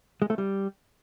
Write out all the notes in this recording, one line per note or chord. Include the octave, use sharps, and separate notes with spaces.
G#3
A3
G3